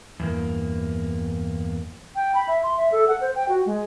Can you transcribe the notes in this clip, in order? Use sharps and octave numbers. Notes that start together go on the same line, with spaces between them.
E2 G2 A#3
G5
B5
E5
C6
E5
A4
F#5
C5
G5
F#4
G#3